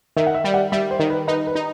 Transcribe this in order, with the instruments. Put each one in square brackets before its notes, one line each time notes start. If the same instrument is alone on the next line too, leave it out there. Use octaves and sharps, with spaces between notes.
[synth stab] D#3 [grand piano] E5
[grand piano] F#5
E5
[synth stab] G3
[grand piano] F#5
[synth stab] G3 [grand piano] E5
[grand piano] C5
[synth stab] D#3
[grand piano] B4
[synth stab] D#4 [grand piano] B4
[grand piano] B4
[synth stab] D#4